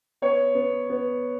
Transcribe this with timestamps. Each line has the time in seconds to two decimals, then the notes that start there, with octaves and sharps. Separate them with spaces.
0.22 B3 C#5
0.55 B3
0.90 B3